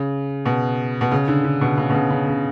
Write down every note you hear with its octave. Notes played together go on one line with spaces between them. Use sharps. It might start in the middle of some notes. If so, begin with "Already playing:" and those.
Already playing: C#3
B2
B2
C#3
D3
D3
B2
C#3
B2
C#3
C#3
C#3